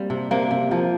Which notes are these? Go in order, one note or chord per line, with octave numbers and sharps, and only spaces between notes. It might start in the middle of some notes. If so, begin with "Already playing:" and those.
Already playing: G3 A#3 C4
C3
C3 A#3
C3
F3 A#3